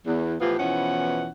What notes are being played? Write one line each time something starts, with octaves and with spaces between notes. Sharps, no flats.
E2
A2 E3 F3 B3 F4 G4
E2 B2 E3 F3 C#4 F#5